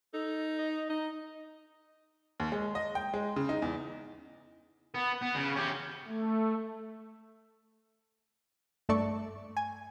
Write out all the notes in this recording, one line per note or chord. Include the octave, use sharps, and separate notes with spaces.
D#4 A4
D#5
D#4 D#5
D#2
G#3
D#5
G5
G#3
C#3
D#4
E2
B3
B3
C#3
C#4 G4
A3
G2 A3 A4 D5 A5 C#6
G#5